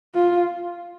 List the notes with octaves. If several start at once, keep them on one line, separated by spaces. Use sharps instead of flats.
F4